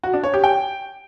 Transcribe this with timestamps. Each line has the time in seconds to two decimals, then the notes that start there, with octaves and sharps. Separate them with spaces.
0.04 F#4
0.14 D4
0.24 C#5
0.34 G4
0.44 G5